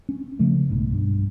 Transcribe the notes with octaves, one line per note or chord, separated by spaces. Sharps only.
C#4
C#3 F3 A3
B1 G#2
G2